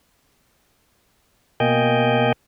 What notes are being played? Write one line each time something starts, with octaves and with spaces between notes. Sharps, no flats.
B2 A#3 D#5 G5 G#5 G6